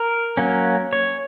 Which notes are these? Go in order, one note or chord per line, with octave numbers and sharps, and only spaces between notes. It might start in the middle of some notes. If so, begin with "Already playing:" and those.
Already playing: A#4
F#3 A#3 C#4
C#5